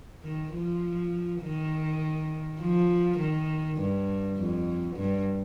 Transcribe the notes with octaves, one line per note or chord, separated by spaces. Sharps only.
D#3
F3
D#3
F3
D#3
G2
F2
G2